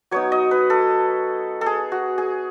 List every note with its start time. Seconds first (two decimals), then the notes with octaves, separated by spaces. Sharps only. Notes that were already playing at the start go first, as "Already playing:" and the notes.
0.11 F#3 B3 D#4 C#5
0.32 D#5
0.51 B4
0.70 A4
1.61 A4
1.66 G#4
1.92 F#4
2.18 G#4